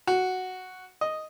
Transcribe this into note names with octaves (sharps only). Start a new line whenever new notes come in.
F#4
D#5